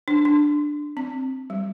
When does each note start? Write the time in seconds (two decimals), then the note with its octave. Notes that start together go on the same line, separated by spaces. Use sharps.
0.08 D4
0.25 D4
0.97 C4
1.50 G3